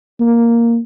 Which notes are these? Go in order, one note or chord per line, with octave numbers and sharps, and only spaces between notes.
A#3